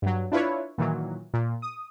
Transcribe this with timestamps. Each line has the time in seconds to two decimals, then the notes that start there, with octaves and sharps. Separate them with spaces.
0.02 G2 F#3
0.32 D4 E4 F4 B4 C#5
0.78 A#2 D#3 E3 F#3
1.34 A#2
1.62 D#6